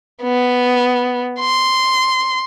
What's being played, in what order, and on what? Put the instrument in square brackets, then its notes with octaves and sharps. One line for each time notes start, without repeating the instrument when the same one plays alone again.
[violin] B3
C6